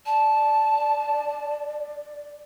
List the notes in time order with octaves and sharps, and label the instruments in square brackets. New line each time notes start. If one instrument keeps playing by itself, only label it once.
[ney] D5 [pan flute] A5